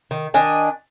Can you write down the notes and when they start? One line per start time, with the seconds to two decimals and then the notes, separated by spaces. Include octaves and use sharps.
0.11 D#3
0.34 D#3 D4 D#5 G#5